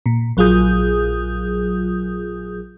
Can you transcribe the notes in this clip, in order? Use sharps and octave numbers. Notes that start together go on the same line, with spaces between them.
A#2
A#1 F#3 F4 G#4 D#6 G6